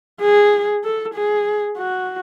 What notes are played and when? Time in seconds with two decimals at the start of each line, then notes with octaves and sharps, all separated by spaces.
0.22 G#4
0.84 A4
1.15 G#4
1.77 F#4